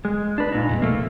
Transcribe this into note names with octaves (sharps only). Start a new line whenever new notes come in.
G#3
D4 B4
A#2 D#4
E2 B2 G3
C2 F3 A3 A#3